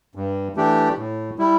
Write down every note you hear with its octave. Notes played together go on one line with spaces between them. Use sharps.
G2
E3 A3 D4 G4
A2
G3 E4